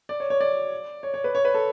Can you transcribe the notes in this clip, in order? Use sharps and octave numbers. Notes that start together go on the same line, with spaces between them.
D5
C#5
C#5
D5
C#5
C#5
B4
C#5
B4
A4